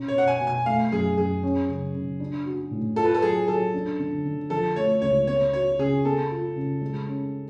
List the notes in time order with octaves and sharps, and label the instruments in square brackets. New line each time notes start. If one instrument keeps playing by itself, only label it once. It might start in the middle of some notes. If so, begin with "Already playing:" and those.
Already playing: [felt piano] B2 C#4
[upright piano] C#5
[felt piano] B2 [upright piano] F#5
[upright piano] G#5
[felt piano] B2
[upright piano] G#5
[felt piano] A3 [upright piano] F5
[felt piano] F#2 [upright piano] G#4
[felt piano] F#2 [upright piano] G#4
[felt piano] C#4
C#3
C#3
D4
F#4
A2
[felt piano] F4 [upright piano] A4
[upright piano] B4
A4
[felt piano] F#3 [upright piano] G#4
[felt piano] F#3 [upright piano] A4
[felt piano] D4
D3
D3
[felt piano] F3 [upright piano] A4
[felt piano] A3 [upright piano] C#5
[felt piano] C#2 [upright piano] C#5
[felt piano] B3 [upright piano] C#5
[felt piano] F#4 [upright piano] C#5
[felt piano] C#3 [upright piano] G#4
[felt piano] B3 [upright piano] A4
[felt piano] F4
C#3
G#3
C#4